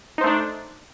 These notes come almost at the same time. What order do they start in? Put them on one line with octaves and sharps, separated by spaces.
D#4 C5 A3 D4